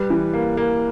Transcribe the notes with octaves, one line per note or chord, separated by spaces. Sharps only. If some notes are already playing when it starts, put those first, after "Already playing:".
Already playing: G3 B4
E3
A#3
A#3